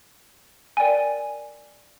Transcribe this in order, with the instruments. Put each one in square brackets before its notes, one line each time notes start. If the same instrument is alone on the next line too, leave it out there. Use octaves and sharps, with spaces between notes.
[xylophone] A#4 D5 G5 G#5